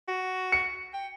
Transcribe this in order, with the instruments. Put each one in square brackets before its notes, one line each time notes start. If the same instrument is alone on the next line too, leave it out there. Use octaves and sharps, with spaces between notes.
[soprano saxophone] F#4
[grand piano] C#7
[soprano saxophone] G5